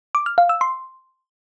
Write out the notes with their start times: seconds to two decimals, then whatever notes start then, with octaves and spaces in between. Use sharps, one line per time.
0.15 D6
0.26 F6
0.38 F5
0.49 E6
0.61 C6